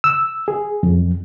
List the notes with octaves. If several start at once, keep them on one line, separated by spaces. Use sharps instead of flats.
E6
G#4
F2